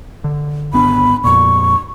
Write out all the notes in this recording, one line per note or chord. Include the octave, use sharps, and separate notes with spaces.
D3
G#1 B3 D4 B5
F2 A#2 C#6